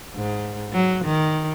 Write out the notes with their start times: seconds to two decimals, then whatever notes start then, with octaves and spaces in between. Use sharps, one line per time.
0.15 G#2
0.72 F#3
1.04 D#3